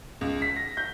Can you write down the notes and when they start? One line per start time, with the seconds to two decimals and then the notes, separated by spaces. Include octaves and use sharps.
0.21 C#2
0.42 B6
0.56 A#6
0.77 G6